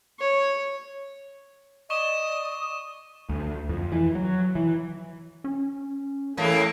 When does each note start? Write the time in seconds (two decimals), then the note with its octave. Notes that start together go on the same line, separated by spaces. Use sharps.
0.19 C#5
1.90 D5 D#5 C#6 D#6 E7 G7
3.29 D2
3.69 F2
3.92 E3
4.15 F#3
4.55 E3
5.44 C#4
6.37 A2 E3 A3 A#3 G#4 A4